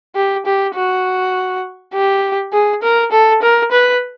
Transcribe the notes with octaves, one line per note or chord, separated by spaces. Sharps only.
G4
G4
F#4
G4
G#4
A#4
A4
A#4
B4